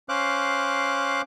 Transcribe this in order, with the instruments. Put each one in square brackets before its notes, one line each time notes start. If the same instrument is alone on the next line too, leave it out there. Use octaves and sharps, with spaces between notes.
[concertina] C#4 C5 F5 D6 F#6